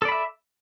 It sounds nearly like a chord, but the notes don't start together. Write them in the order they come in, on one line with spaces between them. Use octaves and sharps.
A4 D5 B5 E5